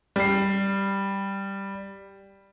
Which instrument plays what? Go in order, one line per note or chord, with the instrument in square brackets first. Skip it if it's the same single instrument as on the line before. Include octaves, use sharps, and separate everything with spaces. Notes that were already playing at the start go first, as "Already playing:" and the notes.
[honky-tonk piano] G3 C7